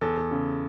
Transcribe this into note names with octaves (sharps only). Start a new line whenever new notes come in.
E2 A4
E2
C#3